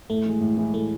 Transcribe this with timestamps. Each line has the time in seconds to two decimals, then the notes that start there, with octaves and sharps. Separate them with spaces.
0.10 A2 A3
0.25 E3 G#3
0.41 A2
0.57 E3 G#3
0.74 A2 A3